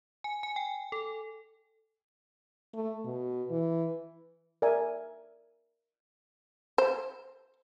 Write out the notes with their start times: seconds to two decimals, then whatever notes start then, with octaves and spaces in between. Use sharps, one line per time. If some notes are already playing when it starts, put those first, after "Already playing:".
0.24 G#5
0.43 G#5
0.56 G5
0.92 A4
2.74 A3
3.05 B2
3.51 E3
4.62 A#4 D5 E5 G#5
6.78 C5